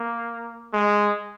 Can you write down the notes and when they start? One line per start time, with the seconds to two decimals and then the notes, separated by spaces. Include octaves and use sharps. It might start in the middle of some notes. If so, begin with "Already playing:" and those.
Already playing: A#3
0.74 G#3